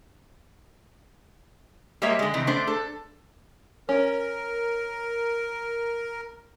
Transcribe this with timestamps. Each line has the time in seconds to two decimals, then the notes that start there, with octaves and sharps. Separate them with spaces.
2.02 G3 G#3 A#3 G4 C#5 E5
2.19 D3 G#3
2.34 C3 D#3 E3
2.47 A3 D4 C5
2.67 A4
3.89 C#4 A#4